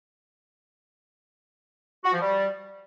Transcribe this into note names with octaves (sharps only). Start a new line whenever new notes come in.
F#4
F3
G3